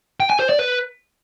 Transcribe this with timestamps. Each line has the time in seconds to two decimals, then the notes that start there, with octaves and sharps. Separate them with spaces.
0.20 G5
0.30 G#5
0.40 C5
0.49 D5
0.59 B4